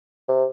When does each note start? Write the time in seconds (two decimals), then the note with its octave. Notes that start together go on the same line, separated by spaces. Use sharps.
0.28 C3